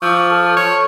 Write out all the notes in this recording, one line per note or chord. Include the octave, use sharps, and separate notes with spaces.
F3 C#6 D6 E6
A4 A5 F6
C#5